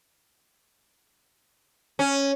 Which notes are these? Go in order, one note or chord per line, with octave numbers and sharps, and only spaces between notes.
C#4